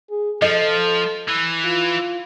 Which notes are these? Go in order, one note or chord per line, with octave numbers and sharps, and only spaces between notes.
G#4
F3 A4 D#5
E3
F4